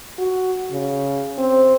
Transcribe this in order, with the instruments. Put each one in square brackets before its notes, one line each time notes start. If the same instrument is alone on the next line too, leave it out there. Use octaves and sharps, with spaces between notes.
[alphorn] F#4
C#3
C4